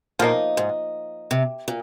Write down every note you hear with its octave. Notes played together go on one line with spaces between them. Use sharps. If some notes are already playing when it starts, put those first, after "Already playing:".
A#2 F3 A#3 D#4
G#2
C3
A#2